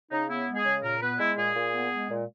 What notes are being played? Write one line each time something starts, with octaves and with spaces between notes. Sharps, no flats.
C#3 D#4
B3 E4
G#3
G#4
C#3
A#2 A#4
B3 B4
G#3 E4
A#2 G#4
A#2
B3
G#3
A#2